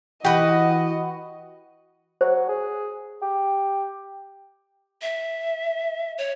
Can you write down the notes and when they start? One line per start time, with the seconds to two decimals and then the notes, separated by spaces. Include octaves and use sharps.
0.25 E3 F#4 G4 B4 D#5
2.21 F#3 C5
2.49 G#4
3.22 G4
5.02 E5
6.18 C#5